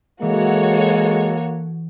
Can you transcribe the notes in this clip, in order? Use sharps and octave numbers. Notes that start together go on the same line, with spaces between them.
E3 G#3 A#3 F#4 A4 C#5